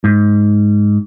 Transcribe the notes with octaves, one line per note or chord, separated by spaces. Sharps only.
G#2